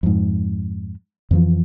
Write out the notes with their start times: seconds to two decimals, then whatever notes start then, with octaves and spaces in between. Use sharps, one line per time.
0.03 F2 G#2
1.31 F2 E3 F3